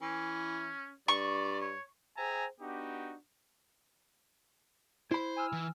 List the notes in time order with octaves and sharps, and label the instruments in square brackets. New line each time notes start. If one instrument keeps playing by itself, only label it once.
[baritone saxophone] E3 [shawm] C#4
[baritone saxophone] G2 [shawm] D5 [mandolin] C#6
[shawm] C#5
[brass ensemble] G#4 C5 E5 G5 G#5 A#5
B3 D4 D#4 F#4 G4
[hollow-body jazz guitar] E4 B5 [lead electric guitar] C5
[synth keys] G#5 E6 F6
[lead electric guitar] E3